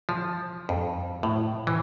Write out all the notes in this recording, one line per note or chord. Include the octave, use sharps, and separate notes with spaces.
F3
F2
A2
E3